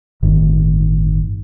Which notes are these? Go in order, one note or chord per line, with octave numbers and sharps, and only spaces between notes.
G1 A2 D#3